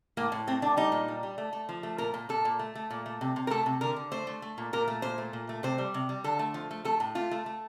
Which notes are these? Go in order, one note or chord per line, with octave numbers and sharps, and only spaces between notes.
A2 A#3
A2
A3 C4
A3 D4
G3 D#4
A#2
G3
G3
A3
A3
F3
A3
A#2 A#4
A#2
A#2 A4
A#2
A3
A3
A#2
A3
C3
C3
A#4
A3 A4
C3
D3 A#4
D3
A3 C5
A3
A3
A#2
A#2 A#4
A3
A#2 C5
A3
A#2
A3
C3 C5
G3
C3
G3
D3 A4
A3
F3
A3
A3 A4
A2
A3 F4
A3
A3